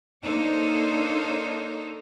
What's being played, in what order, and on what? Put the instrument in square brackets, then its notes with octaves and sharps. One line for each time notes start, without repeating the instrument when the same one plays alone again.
[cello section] A#3 D4 D#4 A4 C5 C#5